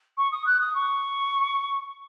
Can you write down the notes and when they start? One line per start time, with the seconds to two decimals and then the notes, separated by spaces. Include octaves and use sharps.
0.17 C#6
0.32 D#6
0.46 F#6
0.60 D#6
0.75 C#6